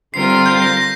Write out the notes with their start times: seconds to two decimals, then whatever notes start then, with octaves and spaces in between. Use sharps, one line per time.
0.14 D3 G3 C4 F4 A#4 C7
0.30 C7
0.46 G6
0.62 A#6
0.77 A#6